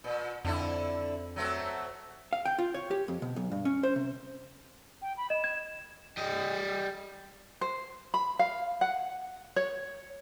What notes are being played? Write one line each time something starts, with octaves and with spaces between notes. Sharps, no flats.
A#2
F2 D3 D4 E4
F#3 A3 C4
F5
G5
F4
C#5
G4
F2
B2
B1
G2
C#4
C5
C3
G5
B5
D#5 E7
G#6
G3 D#5
C5
B5
F5
F#5
C#5